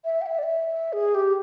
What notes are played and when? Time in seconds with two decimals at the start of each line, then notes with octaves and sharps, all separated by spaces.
0.05 E5
0.22 G5
0.26 E5
0.39 D5
0.43 E5
0.93 G#4
1.15 G4